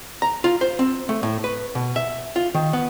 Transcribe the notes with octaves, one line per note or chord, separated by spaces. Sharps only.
A#5
F4
C5
C4
A3
A2
B4
B2
E5
F4
D#3
B3